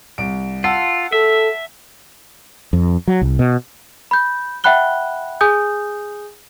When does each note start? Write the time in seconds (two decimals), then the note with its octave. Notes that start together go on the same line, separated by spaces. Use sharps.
0.18 C2 D7
0.64 F4 F#5 A5 E6
1.12 A4 E5
2.73 F2
3.08 F#3
3.21 C2
3.39 B2
4.11 B5 G6
4.64 E5 F#5 G5 B5 F#6 G7
5.41 G#4 G#5 D#6 G6